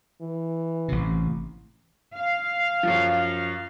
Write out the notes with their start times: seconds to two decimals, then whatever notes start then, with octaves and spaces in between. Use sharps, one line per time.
0.22 E3
0.88 A1 C3
2.16 F5
2.83 F#2 F3